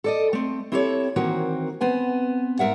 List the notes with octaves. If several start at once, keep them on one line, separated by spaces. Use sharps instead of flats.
A4 D5 D#5
A3 C4
C4 E4 G4 A4 B4 C#5
D#3 E3 A#3 C4 F#4 A#4
B3 C4 G#5
G#2 A#4 E5 F#5